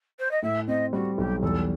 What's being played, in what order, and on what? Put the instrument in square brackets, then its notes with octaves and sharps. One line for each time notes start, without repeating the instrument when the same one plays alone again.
[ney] C5
D#5
[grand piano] A2 [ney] E5
[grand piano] C4 [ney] D#5
[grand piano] G3 [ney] F#4
[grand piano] B1 [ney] G4
[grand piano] E2 [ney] A4